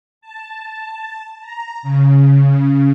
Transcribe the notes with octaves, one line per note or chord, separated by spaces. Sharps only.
A5
A#5
C#3